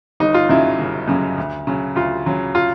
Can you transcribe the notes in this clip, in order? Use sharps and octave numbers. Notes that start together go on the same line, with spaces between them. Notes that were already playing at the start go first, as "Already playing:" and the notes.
G1 D#4
F4
F#2 C#3 F#3 E4
G1
F#2 C#3 F#3
D2
C#3 F#3
D2 F4
C#3 F#3
F4